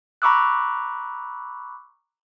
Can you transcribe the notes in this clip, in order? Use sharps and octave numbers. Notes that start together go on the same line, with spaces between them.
A#5 B5 C#6 D6 E6 F#6